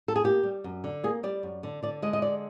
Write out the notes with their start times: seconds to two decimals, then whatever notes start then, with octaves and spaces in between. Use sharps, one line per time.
0.08 A4
0.16 G#4
0.24 A#3 G4
0.43 G3
0.64 F#2
0.84 D3
1.04 A#3 G#4
1.23 G3 D5
1.43 F#2
1.63 D3
1.83 D3 D5
2.02 G#3 D#5
2.13 D#5
2.22 D3 D5